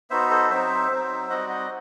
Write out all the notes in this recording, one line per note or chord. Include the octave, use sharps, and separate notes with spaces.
B3 D#4 F#4 C5 E5
A4 C5
F#3 C4 D#4 C5 E5
F#3 C4 D#4
G3 C4 D#4 F#4 D#5 F#5
D#5 F#5